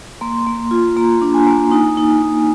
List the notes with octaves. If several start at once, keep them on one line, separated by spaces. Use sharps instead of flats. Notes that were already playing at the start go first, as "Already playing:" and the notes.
A#3 C6
A#3
F4
A#3 A#5
D4
G#5
A#3
D#4
D#4
D#4